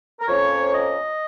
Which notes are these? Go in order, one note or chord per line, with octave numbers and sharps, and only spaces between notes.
A#4
F2 F3 A#3 C#4 C#5
D#5